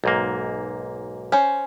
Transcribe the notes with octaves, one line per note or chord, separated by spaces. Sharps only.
B1 G#2 A#3
C#4 C5